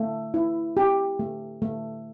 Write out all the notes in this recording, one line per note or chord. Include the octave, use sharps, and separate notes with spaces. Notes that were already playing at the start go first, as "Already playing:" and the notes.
Already playing: A3
E4
G4
A3
A3